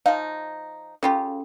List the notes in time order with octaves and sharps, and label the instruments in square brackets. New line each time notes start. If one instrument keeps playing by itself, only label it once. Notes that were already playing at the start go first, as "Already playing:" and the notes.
[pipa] F3 D#4 [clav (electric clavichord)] F5
[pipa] C#3 F4 G4 [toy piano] C#4 A4 B5